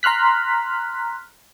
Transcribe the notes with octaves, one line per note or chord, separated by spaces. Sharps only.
A#5 C6 F6 F#6 B6